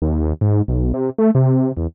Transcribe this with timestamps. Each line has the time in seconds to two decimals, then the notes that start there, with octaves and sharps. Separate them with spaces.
0.02 D#2
0.41 G#2
0.68 B1
0.94 C3
1.18 A3
1.35 C3
1.77 E2